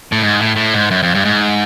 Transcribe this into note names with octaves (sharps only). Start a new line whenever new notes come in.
A2
G#2
A2
A2
G#2
F#2
F2
G2
G#2